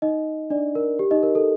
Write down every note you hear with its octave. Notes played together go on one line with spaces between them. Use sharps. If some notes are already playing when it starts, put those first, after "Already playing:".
D#4 D#5
D4 D5
A#4
G4
D#4 D#5
A#4
A4